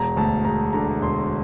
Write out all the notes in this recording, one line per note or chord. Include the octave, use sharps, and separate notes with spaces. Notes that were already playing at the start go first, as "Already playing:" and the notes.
Already playing: E1 A#5
D2 A5
E1 A#5
D3 A#5
E1 C6